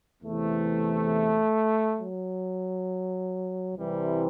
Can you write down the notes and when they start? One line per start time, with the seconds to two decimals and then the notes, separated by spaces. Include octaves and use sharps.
0.23 E2 C3 E3 A3
1.99 F#3
3.75 C2 C3 E3 G3